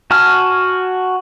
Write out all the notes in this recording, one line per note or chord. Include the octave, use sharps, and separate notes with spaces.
F#4 G#5 A5 F6